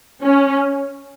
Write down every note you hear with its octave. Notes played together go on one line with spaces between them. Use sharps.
C#4